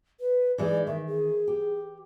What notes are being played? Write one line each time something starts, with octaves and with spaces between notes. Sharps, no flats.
B4
E3 G#3 D#4 D5
D#3 E5
G#4
G4